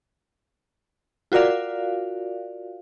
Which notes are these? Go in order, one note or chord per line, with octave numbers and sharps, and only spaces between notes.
F4 F#4 A#4 D5 F5